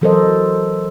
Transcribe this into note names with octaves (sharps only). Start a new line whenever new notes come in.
E3 F#3 A4 A#4 C5 D#5